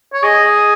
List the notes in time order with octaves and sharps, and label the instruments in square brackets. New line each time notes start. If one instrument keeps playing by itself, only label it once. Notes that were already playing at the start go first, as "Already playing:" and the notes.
[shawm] C#5
[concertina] G#4 [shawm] D#5